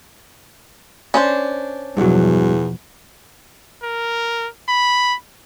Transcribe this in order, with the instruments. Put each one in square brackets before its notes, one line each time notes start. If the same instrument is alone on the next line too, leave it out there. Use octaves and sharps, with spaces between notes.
[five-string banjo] C#4 D4 C5
[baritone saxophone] E2 [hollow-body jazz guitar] G2 F#3 [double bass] B2 F3
[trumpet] A#4
B5